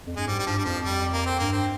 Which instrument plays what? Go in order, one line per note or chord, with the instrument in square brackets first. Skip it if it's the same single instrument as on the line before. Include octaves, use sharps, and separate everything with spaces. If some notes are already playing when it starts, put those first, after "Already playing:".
[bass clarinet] F2
[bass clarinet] G2 [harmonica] G#3
[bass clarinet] G#2 [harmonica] G3
[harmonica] G3
[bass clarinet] G2 [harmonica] F3
[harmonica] G3
[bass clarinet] F2 [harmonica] F3
[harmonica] G3
A#3
C4
[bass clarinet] G2 [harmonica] A#3
[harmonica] C4